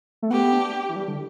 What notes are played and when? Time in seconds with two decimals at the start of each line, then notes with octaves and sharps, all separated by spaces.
0.22 A3
0.31 B3 G4
0.53 D4
0.89 E3
0.96 G3
1.08 D3